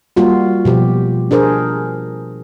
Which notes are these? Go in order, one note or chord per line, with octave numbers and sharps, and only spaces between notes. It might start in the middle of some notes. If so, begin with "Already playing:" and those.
G3 A#3 F4 F#4
B2 F3 G4
D4 G#4 A#4 C5